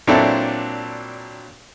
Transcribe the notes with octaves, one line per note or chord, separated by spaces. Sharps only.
A#2 F#3 C4 D4 E4 A4